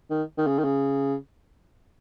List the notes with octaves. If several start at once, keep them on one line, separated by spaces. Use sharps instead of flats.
D#3
D#3
C#3
D#3
C#3